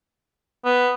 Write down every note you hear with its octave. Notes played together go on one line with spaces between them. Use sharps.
B3